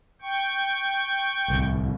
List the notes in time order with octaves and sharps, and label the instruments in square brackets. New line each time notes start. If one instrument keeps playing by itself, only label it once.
[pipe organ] G5 C#6
[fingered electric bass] D1 C2